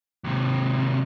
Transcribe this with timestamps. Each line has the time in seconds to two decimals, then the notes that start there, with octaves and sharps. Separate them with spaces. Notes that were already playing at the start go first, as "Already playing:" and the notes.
0.24 D#2 C3